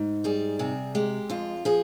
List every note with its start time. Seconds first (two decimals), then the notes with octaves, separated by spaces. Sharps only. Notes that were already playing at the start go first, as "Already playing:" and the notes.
Already playing: G#2
0.24 G3 G#4
0.59 C3 G#4
0.95 G#3 G4
1.30 F2 F4
1.65 F3 G#4